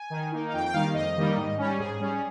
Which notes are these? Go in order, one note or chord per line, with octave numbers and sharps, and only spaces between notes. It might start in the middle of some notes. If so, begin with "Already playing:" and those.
Already playing: G#5
D#3
A#3 D#4
F5
F2 G5
G5
D#3 G3 A#3 D#4 F5
F2 D#5
D#3 G3 A#3 D#4
G#2
G3 C#4
G#2 G#4
G3 C#4